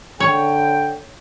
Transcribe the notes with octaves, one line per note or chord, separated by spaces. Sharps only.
D3 C#5 G5